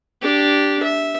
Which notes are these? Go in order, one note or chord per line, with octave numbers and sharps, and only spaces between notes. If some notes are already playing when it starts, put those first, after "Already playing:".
D4 G4
E5